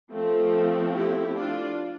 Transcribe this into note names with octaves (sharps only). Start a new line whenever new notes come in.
F3 A3 C4
E4 G4
D4 F4